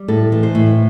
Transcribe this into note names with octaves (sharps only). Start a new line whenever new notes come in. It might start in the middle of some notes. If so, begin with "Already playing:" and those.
Already playing: G3
A2 A4
E3
C5
A2